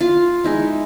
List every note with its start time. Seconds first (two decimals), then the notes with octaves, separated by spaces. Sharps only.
0.01 F4
0.44 G#3 D#4 E4